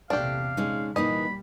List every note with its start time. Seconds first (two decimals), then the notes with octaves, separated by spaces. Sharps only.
0.10 A#1 E2 C3 A3 D4 G4 F5
0.57 G#3 C#4 D#4
0.96 A#2 E3 G3 A#3 D#4 D#5 B5